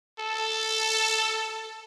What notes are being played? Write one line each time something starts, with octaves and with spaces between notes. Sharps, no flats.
A4